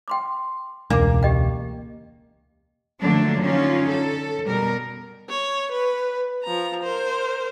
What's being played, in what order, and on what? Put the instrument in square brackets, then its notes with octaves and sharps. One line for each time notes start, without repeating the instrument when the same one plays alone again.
[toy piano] G5 C6 D6
[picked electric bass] E1 [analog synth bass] C#2 [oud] A#3 [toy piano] D4 D6
[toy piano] G4 D#5 G5
[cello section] D3 F3 F#3 A3 A#3 D4
D3 C#4 D#4 F4
A4
B2 G3 A#4
[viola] C#5
B4
F3 A#5
A#4 C5